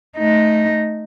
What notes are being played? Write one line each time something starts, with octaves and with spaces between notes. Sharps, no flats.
A3 D#4